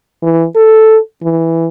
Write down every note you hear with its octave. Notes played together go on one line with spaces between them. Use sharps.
E3
A4
E3